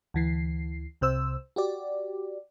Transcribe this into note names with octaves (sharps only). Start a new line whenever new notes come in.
D2 E3 C7
C2 C3 C5 E6
F#4 G4 D5